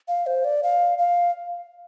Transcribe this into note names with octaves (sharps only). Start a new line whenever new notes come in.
F5
C5
D5
F5
F5